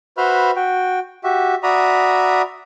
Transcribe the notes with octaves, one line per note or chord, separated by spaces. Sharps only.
F#4 B4 C5 E5 B5 F6
F#4 G5
F#4 G4 E5
F#4 D5 E5 A#5 B5 D#6